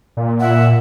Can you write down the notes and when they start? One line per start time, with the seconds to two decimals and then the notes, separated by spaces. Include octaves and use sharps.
0.17 A#2
0.40 E5 F#5